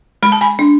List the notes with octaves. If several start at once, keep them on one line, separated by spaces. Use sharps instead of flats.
G#3 B5
A5
G#5 B5
D4